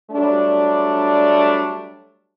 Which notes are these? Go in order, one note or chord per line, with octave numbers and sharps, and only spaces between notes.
F#3 G3 A3 D4